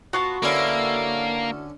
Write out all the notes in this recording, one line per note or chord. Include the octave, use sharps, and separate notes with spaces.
B3 F4 F#4 A5
D3 A#3 C#4 E4 A4 B4